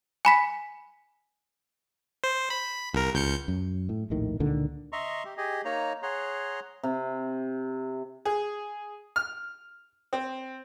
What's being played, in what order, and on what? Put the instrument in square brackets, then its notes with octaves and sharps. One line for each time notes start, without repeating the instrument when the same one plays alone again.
[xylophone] G#5 B5 B6
[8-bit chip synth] C5
B5
C2 A#4
C#2 G6 C#7
[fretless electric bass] F#2
A2
A#1 D#2 A2 D#3
C#2 A#2 D3 D#3
[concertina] D#5 E5 A#5 C6 C#6
G4
G4 G#4 D#5
A#3 D#4 C#5 A#5
G#4 C#5 F#5 A#5 C6
[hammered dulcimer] C3
[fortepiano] G#4
F6
C4